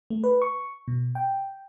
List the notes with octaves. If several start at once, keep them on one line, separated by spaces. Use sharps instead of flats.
A3
B4
C#6
B2
G5